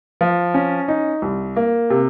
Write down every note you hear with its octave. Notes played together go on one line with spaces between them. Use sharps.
F3
C#4
D#4
C2
A#3
C3